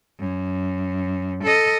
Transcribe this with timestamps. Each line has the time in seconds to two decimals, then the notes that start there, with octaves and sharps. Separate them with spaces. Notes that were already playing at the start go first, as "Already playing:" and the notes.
0.19 F#2
1.44 A4 D#5